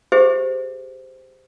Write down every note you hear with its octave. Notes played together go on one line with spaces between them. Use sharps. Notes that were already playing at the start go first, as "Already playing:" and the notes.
G4 G#4 C5 E5